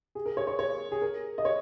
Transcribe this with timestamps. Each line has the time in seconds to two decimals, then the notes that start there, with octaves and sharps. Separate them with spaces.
0.15 G#4
0.26 A#4
0.37 C#5
0.47 C#5
0.59 C#5
0.92 G#4
1.02 A#4
1.38 D#5
1.45 C#5